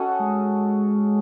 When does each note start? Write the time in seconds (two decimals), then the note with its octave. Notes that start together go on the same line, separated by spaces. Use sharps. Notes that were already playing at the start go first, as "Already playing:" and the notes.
Already playing: C#4 F#4 A4 D#5
0.20 G#3